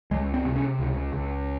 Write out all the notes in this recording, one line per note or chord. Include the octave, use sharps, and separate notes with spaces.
C#2 G#3
C4
C3
C#4
C#2
C#2